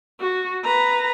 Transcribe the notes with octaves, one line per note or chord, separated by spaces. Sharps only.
F#4
B4 A#5